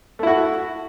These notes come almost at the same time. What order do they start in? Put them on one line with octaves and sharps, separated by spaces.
A3 E4 F#4